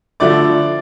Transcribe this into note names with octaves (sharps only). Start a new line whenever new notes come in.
D3 F3 A3 E4 D5 D6